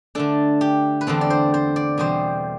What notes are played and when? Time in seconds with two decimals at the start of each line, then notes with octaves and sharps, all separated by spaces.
0.15 D3 A3 D4 A4
0.61 G4
1.01 B4
1.07 E2 D3 A3 C4 A4
1.21 D5
1.30 C5
1.54 C5
1.76 D5
1.98 E2 B2 G3 C4 C5